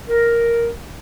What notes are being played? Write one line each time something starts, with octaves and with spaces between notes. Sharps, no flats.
A#4